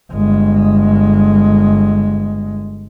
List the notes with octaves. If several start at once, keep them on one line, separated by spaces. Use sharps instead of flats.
G1 G#3